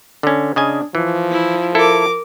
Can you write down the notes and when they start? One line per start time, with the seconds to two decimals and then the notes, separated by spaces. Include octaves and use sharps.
0.23 D3 C#4
0.56 C#3 D4 D#5 G#5
0.95 E3 F3
1.31 E4
1.75 E4 A4 A#4 D6